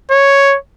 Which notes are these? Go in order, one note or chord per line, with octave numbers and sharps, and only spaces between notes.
C#5